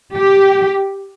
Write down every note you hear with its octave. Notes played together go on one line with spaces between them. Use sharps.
G4